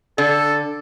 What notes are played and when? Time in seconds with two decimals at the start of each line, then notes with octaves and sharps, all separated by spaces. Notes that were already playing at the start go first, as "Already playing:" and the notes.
0.18 D3 A4